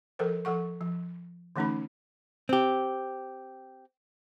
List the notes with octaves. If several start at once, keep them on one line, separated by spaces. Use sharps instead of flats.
F3 A4 A#4 C5
F3 A4 F#5 C#6
F3
D3 E3 A3 C#4 D#4 B5
C4 G4